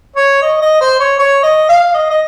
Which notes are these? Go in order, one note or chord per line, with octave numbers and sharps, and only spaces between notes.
C#5
D#5
D#5
C5
C#5
C#5
D#5
F5
D#5
D#5